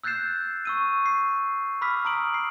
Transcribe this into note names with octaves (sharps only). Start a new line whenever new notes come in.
E6 F#6 G6 A6 C7 E7
C#6 E6 D#7
C7
B5 D6 E6 F6 B6
A#5 D#6 D7 F#7
C7